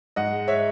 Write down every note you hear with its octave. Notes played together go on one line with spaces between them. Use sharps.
G#2 D#5 F#5
G#3
G#3 C#5 E5